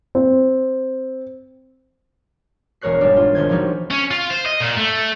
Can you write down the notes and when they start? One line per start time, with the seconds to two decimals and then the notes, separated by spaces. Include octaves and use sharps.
0.15 C4
2.81 E1 G#3 A#4 C#5 F#6 C7
3.01 G#1 G3 G#3 D4
3.16 F4
3.35 E1 D#3 C5 G#6
3.49 E3 F3 G3 D#4 F#4
3.91 C#4
4.11 F4
4.30 C5
4.46 D#5
4.60 A#2
4.77 A3